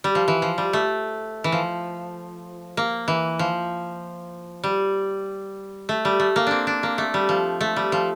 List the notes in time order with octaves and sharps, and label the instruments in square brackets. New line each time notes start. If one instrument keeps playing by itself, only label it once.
[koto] G3
F3
E3
F3
G3
A3
E3
F3
A#3
E3
F3
G3
A3
G3
A3
A#3
C4 D4
D4
A#3
A3
G3
F3
A3
G3
F3